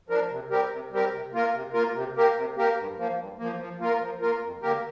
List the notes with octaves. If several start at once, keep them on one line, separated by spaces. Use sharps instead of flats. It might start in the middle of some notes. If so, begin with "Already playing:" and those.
F3 D4 A#4
C3
G3 C4 G4 A#4
C3
G3 C4 G4 A#4
C3
A#3 F4 A#4
C3
A#3 F4 A#4
C3
A#3 G4 A#4
C3
A#3 G4 A#4
G2
F3 A#3
G2
F3 A#3
F3
A#3 F4 A#4
F3
A#3 F4 A#4
F2
D3 A#3 G4 A#4